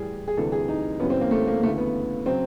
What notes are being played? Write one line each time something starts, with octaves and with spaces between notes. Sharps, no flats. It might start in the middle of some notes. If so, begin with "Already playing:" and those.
Already playing: A2 E3 G3 G#4
G#4
D2 C3 E3 G3 A4
G#4
D#4
F#2 C#3 E3 G3 B3
C4
A#3
A3
A#3
D2 C#3 E3 A3
B3
C#3 F#3 C4